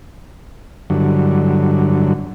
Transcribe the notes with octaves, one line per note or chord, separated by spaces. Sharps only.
G2 D3 F#3